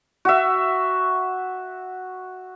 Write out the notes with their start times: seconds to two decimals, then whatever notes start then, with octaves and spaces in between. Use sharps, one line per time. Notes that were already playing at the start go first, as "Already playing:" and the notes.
0.25 F#4 E5